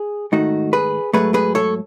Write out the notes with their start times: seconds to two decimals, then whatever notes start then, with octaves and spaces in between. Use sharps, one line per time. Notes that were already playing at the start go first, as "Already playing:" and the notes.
Already playing: G#4
0.32 G#2 D#3 A3 D#4 F#4
0.73 G#4 B4
1.13 G#2 F#3 A3 G#4 B4
1.34 G#4 B4
1.55 A4 C#5